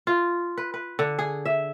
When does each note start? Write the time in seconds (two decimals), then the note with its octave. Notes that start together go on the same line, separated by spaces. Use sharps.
0.07 F4
0.57 B4
0.74 B4
0.99 D3
1.19 G#4
1.45 E5